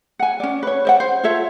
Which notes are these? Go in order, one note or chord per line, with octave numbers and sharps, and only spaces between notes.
F#5 G#5
C#4 D5
B4 C#5
C5 D5 F#5
C5
F4 A4 C#5 E5